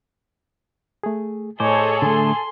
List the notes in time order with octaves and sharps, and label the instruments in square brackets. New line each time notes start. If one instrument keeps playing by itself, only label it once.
[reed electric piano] A3 G#4
[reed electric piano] A2 G#5 D6 [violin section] G#4 A4 [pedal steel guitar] C5 [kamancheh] C#5 D#5
[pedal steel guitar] D3 A3 [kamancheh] C6